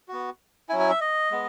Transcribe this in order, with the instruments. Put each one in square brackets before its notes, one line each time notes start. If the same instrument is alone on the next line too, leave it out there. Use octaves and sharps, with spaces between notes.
[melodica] B3 F#4
F#3 C#4 E4 G#5
G#5
E5
D#5
G#3 B3